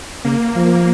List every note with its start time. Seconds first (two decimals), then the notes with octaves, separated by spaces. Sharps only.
0.25 C#3 A#3
0.55 F3